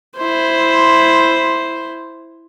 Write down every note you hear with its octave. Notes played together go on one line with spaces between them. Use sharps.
E4 C5